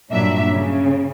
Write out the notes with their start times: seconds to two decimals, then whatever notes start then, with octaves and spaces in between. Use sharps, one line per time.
0.11 G2 A#2 F#3 D4 E5
0.52 C#3